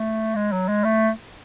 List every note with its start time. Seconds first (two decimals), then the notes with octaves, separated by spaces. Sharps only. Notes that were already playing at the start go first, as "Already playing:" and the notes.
Already playing: A3
0.36 G#3
0.52 F#3
0.68 G#3
0.84 A3